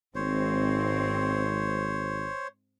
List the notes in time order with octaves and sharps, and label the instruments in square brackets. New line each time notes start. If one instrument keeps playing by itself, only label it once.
[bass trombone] G#1 [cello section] G#2 C4 [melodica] C5 C#5